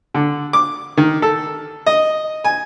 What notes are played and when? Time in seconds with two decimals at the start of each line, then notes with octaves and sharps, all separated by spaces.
0.14 D3
0.53 D6
0.97 D#3
1.22 A4
1.87 D#5
2.44 G#5